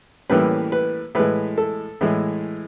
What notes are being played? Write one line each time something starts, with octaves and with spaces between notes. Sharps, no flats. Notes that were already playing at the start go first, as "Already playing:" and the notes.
A2 E3 G3 A#3 C#4 B4
B4
A2 E3 G#3 B4
A4
A2 E3 G#3